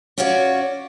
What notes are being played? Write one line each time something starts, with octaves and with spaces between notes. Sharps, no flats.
C#4 F4 F#4 C#5 D5